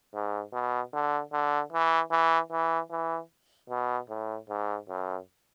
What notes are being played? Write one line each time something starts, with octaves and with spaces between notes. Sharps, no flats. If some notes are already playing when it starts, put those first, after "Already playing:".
G#2
B2
D3
D3
E3
E3
E3
E3
B2
A2
G#2
F#2